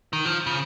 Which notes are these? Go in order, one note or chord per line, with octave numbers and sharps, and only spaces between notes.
D#3
F3
C#3